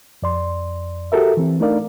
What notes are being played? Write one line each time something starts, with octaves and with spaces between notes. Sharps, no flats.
F2 D5 C6
F#4 G4 A4 A#4 E5
E3 C4
A3 D4 D#4 A#4 D5 F5